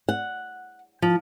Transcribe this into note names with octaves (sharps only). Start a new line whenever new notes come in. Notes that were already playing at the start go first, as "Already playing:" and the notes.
F#5
F3